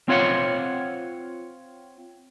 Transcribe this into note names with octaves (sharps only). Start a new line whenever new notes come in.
C4 F4 C#5 F5 F#5